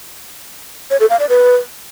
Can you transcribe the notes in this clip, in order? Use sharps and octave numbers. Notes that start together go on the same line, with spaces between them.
C#5
A4
F5
D5
B4